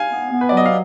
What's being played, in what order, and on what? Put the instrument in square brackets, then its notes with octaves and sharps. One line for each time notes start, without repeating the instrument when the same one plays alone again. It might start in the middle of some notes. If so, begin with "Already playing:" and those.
Already playing: [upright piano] F5 G#5
[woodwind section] B3
B3
[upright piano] B4
D5
[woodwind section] F#3 [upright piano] D#5
[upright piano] F5